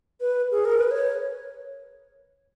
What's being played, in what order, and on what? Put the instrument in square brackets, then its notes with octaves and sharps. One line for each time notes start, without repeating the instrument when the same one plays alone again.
[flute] B4
G#4
A#4
B4
C#5